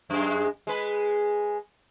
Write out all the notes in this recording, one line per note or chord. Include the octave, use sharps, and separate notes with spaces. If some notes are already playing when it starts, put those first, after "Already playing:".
F#2 G#3
G#3 B4